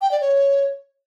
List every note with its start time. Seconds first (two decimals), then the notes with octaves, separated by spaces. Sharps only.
0.02 G5
0.11 D5
0.21 C#5